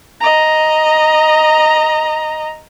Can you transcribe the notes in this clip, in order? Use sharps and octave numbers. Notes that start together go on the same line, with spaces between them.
D#5 A#5